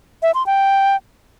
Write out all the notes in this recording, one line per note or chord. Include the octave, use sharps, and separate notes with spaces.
E5
C6
G5